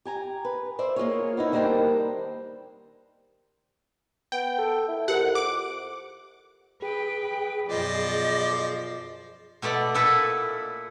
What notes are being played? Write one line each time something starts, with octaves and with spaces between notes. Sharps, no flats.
G4 G#5 A#5
B4
C5 D5 E5
A#3 F4 G#4 C#5
B3 D#4 E4
D#3 G3 A#3 D4 C5 G5
B3 G5
A4
E4
F2 G4 A#4 F#5
D6
G#4 B4 G5
F#2 B2 F3 D5 D#5
B2 A3 B3 D5
A#2 E4 A4 B4 F#5